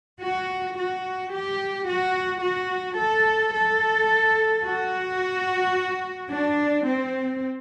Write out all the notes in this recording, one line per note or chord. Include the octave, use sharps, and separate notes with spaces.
F#4
F#4
G4
F#4
F#4
A4
A4
F#4
D4
C4